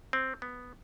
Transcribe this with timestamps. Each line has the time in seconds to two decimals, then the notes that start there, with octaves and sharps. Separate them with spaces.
0.13 C4
0.42 B3